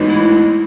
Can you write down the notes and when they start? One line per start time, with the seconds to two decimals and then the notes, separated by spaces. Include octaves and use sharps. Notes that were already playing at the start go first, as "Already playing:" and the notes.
Already playing: A1 G#2 E3 B3 F#4
0.10 E4